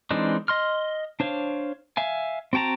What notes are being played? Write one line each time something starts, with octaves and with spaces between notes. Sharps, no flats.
E3 G#3 C4 D4 D#4
D#5 C6 F6
D4 C5 C#5 F5
E5 F5 G#5
C4 F#4 G5 A5 A#5